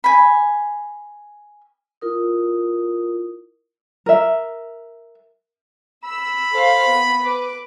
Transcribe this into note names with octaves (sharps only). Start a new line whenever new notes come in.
G#5 B5
E4 F4 A#4 D#6
A#4 E5
B5 E6
A4 C5 F5
B3
B4 D6